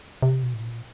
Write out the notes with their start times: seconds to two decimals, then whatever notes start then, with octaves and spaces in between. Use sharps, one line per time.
0.22 C3
0.43 B2
0.54 A2
0.63 A#2